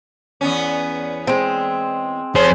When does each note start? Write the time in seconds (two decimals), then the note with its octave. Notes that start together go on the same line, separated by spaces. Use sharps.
0.41 E2 B3 C#4
1.27 G#3 C4
2.35 F2 G#4 C5 C#5